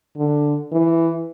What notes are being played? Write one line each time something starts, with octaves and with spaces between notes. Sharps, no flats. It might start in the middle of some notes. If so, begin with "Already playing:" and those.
D3
E3